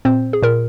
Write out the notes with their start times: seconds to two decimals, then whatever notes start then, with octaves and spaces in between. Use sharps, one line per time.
0.05 A#2 C4 C5
0.33 G#4
0.42 A#2 A#4